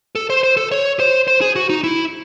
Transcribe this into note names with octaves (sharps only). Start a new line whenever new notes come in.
A4
C5
C5
A4
C#5
C5
C5
G#4
F#4
D#4
E4